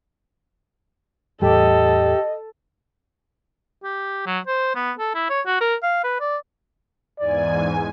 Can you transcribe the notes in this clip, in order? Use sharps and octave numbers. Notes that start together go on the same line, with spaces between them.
E2 A2 G3 G4 A4 D#5
G4
F#3
C5
B3
A4
E4
C#5
F#4
A#4
F5
B4
D5
E2 G#2 D5 G#5